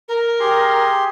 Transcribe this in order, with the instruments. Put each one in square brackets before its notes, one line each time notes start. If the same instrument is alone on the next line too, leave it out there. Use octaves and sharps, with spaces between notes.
[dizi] A#4
[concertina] G4 G#4 C6